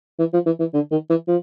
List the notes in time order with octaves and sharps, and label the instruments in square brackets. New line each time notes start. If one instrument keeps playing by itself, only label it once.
[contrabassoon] E3
F3
E3
E3
D3
D#3
E3
F3